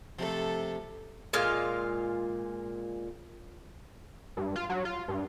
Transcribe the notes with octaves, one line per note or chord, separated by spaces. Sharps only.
C3 F3 A3 A4
A#2 G#3 F4 F5
G2
F4
F#3
F4
G2